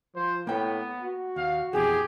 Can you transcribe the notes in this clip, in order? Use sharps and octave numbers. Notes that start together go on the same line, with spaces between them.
F3 C5
A2 A#3 B3 G5
F#4
D#2 F5
F2 B2 E3 G4 G#4